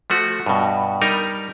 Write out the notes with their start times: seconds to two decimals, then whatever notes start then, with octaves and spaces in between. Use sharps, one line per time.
0.10 F3 A3 F#4
0.46 G2 B2
1.02 G3 D#4 A#4